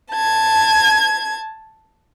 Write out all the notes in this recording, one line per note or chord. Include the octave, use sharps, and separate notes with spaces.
A5 G#6